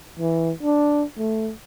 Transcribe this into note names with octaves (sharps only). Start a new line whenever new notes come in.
E3
D4
A3